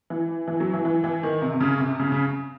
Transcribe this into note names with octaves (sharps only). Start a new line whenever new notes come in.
E3
E3
F#3
E3
E3
E3
D#3
C3
C3
C#3
C3
C#3
C#3